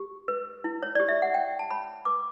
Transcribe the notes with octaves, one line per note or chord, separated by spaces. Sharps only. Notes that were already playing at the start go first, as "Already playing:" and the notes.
Already playing: G4
B4
E4
C#5
G4 D5
E5
F#5
C#5 G5
A5
C#5 B5
B4 D6